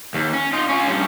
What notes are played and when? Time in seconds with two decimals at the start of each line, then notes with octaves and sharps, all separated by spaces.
0.14 D#2
0.33 C#4
0.53 D#4 F4
0.69 C#4 F4
0.88 G2 C#4